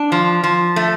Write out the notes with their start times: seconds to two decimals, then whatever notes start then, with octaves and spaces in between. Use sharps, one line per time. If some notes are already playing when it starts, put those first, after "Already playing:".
Already playing: D4
0.12 F3
0.44 F3
0.76 A3